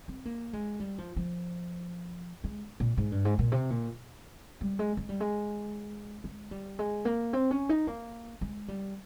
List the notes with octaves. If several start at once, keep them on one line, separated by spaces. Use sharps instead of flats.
C4
A#3
G#3
G3
F3
F3
G#3
A#2
G#2
G2
G#2
A#2
C3
A#2
G3
G#3
G#3
G3
G#3
G#3
G3
G#3
A#3
C4
C#4
D#4
A#3
G#3
G3